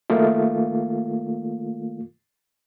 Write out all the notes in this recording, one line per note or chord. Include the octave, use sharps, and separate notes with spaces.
D#3 A3 A#3 F4